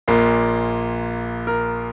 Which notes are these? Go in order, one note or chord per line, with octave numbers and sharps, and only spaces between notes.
A#1 A#2 A#3
A#4